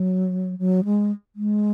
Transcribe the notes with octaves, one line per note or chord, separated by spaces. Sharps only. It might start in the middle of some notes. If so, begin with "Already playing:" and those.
Already playing: F#3
F#3
G#3
G#3